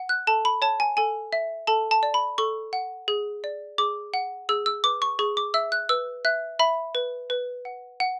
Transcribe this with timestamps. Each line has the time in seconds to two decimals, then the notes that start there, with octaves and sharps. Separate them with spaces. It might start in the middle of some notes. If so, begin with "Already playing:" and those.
Already playing: F#5
0.09 F#6
0.27 A4 A5
0.45 B5
0.62 C#5 A5
0.80 G#5
0.97 A4 G#5
1.33 E5
1.67 A4 A5
1.91 A5
2.03 D5
2.14 B5
2.38 A4 C#6
2.73 F#5
3.08 G#4
3.44 D5
3.78 G#4 D6
4.14 F#5
4.49 G#4 E6
4.66 E6
4.84 B4 D6
5.02 C#6
5.19 G#4 C#6
5.37 D6
5.54 E5 E6
5.72 F#6
5.89 B4 E6
6.25 E5 F#6
6.59 E5 B5
6.95 B4
7.30 B4
7.65 F#5
8.00 F#5